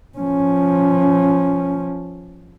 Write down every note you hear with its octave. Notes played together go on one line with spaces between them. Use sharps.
F3 C#4